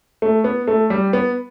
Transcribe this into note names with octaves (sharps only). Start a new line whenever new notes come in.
A3
B3
A3
G3
B3